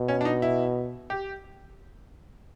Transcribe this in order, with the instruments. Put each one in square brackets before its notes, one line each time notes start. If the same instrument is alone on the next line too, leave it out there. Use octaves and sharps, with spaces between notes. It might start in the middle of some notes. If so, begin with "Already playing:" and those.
Already playing: [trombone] B2
[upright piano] C#4
D4
D#4
E4
G4